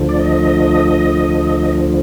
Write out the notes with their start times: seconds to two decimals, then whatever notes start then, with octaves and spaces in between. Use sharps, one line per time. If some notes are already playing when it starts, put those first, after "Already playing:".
Already playing: D2 D3 F3
0.09 D5
0.19 D#5